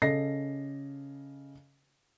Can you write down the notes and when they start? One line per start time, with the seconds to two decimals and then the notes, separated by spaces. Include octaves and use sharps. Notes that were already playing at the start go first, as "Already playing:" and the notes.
0.02 C#3 A4 D#5 A#6 C7